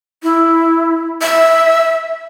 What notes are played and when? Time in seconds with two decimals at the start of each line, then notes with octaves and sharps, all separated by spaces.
0.23 E4
1.22 E5